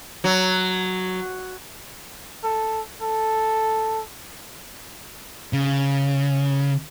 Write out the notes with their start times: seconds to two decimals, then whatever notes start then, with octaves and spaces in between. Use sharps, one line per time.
0.24 F#3
2.44 A4
3.02 A4
5.53 C#3